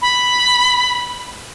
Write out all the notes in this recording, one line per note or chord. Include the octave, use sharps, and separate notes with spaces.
B5